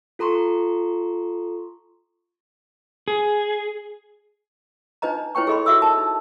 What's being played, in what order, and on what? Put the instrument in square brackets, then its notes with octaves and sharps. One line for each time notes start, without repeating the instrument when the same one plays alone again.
[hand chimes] F4 A4 A#5 C6 C#6
[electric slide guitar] G#4
[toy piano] D4 D#4 B4 D#5 A#5
E4 B4 C#5 G5 C#6
G#4 A4 D#5 B5 C6
F#4 E5 D#6 E6
A#4 A5
D#4